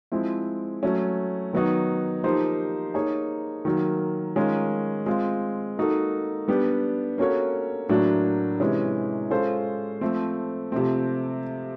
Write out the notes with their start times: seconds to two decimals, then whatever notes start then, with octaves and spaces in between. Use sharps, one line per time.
0.12 F3 G#3 C4 E4
0.83 F#3 A3 C#4
1.53 D#3 F#3 B3 D#4 F#4
2.24 F3 A#3 D#4 G4 C5
2.94 A#3 D#4 G#4 C#5
3.65 D#3 F#3 A#3
4.36 D#3 G#3 C#4 F4 A#4
5.06 G#3 C4 F4
5.78 A#3 D#4 F#4 A4
6.48 G3 B3 D4 G4
7.18 A#3 C#4 F#4 A4 C#5
7.89 A2 F#3 A#3 D4 F#4
8.60 C3 E3 G#3 C#4
9.30 G#3 C#4 F4 A4 C5
10.01 F3 A3 C4
10.72 C3 F3 A3 C4